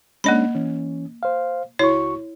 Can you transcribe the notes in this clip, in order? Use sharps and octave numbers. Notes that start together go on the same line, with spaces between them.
G#3 A#3 C#4 D4 D#5 B5
E3 C#4
C5 F5
C#2 E4 F#4 C#5 C#6